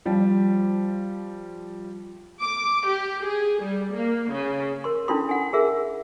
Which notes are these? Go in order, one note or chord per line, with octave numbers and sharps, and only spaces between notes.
F3 G3
D6
G4
G#4
G3
A#3
C#3
A#4 C6
C#4 D4 E4 F4 A4 C6
F#5 G#5
G#4 A#4 E5